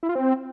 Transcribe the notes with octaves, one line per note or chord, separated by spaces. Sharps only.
E4
F4
C4